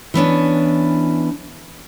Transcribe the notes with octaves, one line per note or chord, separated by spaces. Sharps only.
E3 B3 C#4 D4